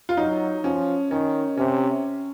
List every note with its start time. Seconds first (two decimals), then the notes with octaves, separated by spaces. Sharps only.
0.09 F4
0.17 F#3 D#4
0.64 F3 C#4
1.11 D#3 C#4
1.57 C3 C#4